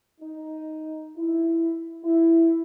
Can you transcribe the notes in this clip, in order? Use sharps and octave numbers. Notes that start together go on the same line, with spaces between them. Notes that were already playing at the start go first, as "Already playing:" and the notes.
D#4
E4
E4